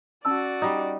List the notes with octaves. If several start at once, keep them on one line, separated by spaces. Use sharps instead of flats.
C#4 F#4 D5 A5 E6
G3 D#4